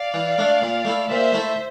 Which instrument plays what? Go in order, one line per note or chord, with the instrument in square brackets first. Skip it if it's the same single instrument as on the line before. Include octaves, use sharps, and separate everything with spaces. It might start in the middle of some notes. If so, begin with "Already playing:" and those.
Already playing: [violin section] D5 F5
[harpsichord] E3
A3 D4
A#2
A3 E4 A4
[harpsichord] A#2 [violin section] C5 E5
[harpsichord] A3 E4 A4